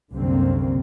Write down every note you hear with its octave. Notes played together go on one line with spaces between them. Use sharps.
C2 F#2 D3 A#3 C4